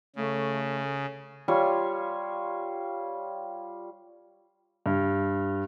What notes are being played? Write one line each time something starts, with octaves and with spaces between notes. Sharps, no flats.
C#3 A3
G3 F4 C#5 G#5
G2